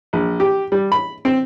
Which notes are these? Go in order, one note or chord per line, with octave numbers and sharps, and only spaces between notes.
A#1
G4
G3
B5
C4